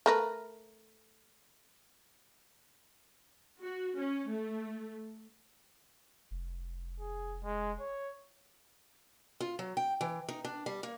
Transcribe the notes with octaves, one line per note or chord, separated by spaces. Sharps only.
A3 A#4 B4
F#4
C#4
A3
F1
G#4
G#3
C#5
F4
F#3
G5
E3
D#4
D4
G3
A#3